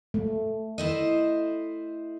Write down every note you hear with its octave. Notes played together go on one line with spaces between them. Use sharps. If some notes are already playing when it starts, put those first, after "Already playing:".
A3
E4 C5 D#5